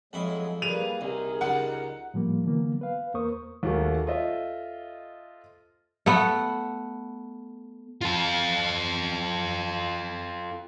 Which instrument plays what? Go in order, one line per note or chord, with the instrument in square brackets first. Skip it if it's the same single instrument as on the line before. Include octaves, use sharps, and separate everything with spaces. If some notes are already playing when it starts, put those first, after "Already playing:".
[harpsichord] F2 E4 [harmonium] F#3 G#3 G#4
[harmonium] G3 A#3 B4 [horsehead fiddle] G#4 [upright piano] D#7 F7
[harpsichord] C2 [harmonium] D#4 [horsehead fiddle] G#4 A#4
[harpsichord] C#2 G3 [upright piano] F#5
[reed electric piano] A2 F3 G3 A#3
D3 E3 F#3 A#3 B3
B4 F5
E2 A#3 A#4 C5 C#6 D#6
[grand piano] D#2 A3 F#4 G#4 A#4 C#6
F4 A4 C5 D#5 E5
[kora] A3 B3
[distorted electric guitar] F4 A4